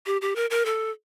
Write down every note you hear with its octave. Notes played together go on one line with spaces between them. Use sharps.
G4
G4
A#4
A#4
A4